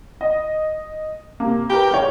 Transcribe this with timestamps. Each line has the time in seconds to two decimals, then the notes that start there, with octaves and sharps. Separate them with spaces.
0.21 D#5
1.40 C3 A#3
1.69 G4 A#4 B4 G5 A#5
1.91 G#2 C#5